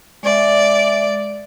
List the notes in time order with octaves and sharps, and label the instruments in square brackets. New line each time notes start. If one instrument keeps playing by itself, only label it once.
[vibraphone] G#3 E5 [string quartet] D5